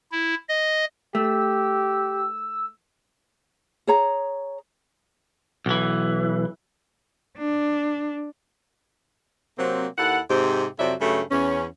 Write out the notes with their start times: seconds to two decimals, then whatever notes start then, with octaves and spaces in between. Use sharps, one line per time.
0.12 E4
0.49 D#5
1.15 A3 G4 E6
3.87 G#4 C#5 A#5
5.66 B1 E3
7.38 D4
9.58 C3 F#3 A#3 C4
9.98 D#2 E4 A4 F#5
10.30 G#2 C3 C4 G4
10.79 F2 C3 F#3 D5 E5
11.01 G2 C#3 F#3 A3
11.31 E2 C#4